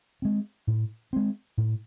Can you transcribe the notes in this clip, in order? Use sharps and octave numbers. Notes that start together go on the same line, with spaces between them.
G#3 C4
A2
G#3 C4
A2